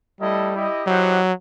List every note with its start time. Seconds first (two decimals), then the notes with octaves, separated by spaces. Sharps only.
0.21 G3 A3 E4 A4 D#5
0.54 E4 G4 D#5
0.87 F#3 E4 G4 C5 D#5 F#5